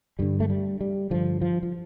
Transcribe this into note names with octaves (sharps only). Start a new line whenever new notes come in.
G2 D3 G3
A3
G3
G3
G2 D3 F3
F3
F3